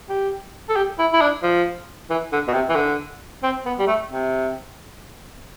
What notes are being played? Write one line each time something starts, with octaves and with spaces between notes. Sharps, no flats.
G4
A4
G4
E4
E4
D4
F3
E3
D3
B2
C3
E3
D3
C4
B3
G3
A3
C3